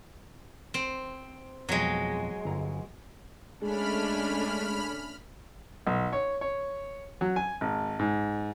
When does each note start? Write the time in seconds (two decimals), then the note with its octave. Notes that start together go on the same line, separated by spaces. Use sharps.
0.74 C4
1.69 F2 B2 F#3 G#3
2.45 G1 A#5
3.62 G#3 A3 C#4 D4 B5 F6
5.87 B1
6.13 C#5
6.41 C#5
7.21 F#3
7.36 G#5
7.61 G#1
7.99 G#2